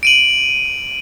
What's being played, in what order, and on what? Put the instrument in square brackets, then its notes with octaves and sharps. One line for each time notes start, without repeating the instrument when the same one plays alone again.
[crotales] D7 D#7 F#7